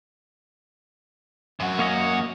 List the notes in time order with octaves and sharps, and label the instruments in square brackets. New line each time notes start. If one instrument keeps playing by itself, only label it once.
[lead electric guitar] F#2 F#4
[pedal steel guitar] A#3 C#5 D#5